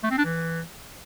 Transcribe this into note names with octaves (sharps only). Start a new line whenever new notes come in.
A3
C4
D4
E3